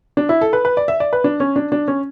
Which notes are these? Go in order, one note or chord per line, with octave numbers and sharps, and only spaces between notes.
D4
E4
A4
B4
B4
D5
E5
D5
B4
D4
C#4
D4
D4
C#4